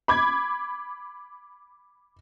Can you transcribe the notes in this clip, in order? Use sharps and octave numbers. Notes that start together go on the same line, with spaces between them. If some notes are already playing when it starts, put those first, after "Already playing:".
B5 D6 G#6